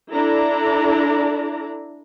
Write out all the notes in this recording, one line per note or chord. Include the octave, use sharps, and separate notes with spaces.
D4 E4 A4 D5 A#5